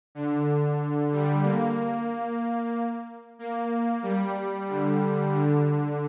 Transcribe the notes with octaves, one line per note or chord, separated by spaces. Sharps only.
D3
G3
A#3
A#3
G3
D3
D3